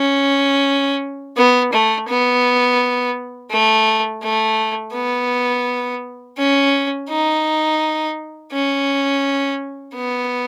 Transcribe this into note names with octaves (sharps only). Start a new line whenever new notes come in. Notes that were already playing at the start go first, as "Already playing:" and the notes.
Already playing: C#4
B3
A3
B3
A3
A3
B3
C#4
D#4
C#4
B3